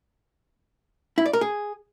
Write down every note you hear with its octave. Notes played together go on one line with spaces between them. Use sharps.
E4
D5
A#4
G#4